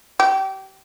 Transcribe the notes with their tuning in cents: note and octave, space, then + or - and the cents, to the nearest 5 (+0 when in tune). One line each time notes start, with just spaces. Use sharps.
G4 -30